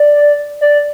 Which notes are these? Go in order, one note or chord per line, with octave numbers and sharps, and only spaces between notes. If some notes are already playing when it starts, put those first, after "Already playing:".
Already playing: D5
D5